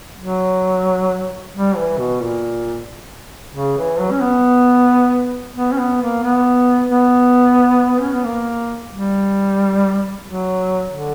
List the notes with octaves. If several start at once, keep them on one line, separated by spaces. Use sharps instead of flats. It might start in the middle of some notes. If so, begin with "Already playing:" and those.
F#3
G3
E3
B2
A#2
C#3
E3
F#3
C#4
B3
B3
C#4
B3
A#3
B3
B3
C#4
B3
A#3
G3
F#3
D3